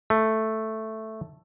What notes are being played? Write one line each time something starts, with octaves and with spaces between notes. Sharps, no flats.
A3